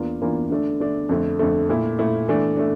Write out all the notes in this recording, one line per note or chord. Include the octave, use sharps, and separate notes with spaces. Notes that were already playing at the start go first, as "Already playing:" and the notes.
Already playing: E2 E3 A#3 D4 F4
E2 E3 A#3 D4 F4
D3 A3 D4
D3 A3 D4
F2 D3 A3
F2 D3 A3
A#2 A3 E4
A#2 A3 E4
E3 A3 D4
A3 D4